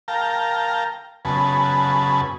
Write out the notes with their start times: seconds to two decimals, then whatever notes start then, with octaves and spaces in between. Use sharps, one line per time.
0.08 A#4 F5 G5 A5 A#5
1.25 F#2 C#3 B3 B4 G#5 A5